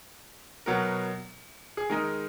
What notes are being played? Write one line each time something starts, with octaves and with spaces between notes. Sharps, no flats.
B2 F#3 B3 A#4
G#4
D#3 G#3 D#4 A#4